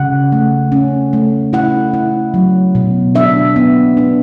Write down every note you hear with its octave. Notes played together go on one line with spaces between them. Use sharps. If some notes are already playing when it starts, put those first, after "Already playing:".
Already playing: C#3 F#5
A3
C#4
A3
E4 F#5
E4
F#3
B2
D4 E5
B3
D4